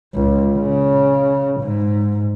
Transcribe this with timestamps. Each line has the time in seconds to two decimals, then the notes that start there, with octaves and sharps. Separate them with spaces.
0.14 C#2
0.54 C#3
1.61 G#2